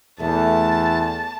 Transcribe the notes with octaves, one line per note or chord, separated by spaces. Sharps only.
E2 A3 A5